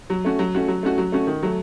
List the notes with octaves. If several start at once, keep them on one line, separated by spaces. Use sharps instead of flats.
F#3
A3 C#4 F#4
F#3
A3 C#4 F#4
F#3
A3 C#4 F#4
F#3
A3 C#4 F#4
D#3
F#3 A3